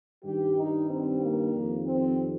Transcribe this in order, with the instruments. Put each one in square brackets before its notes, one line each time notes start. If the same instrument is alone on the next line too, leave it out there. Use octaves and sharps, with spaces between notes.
[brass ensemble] G2 D#3 G3 G4
D#4
C4
A#3
F2 D#3 G3
C4